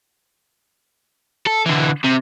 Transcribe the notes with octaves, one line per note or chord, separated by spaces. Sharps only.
A4
D3 E3
C3